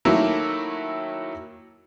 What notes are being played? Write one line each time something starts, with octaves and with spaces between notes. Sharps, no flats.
D#3 F#3 A3 A#3 E4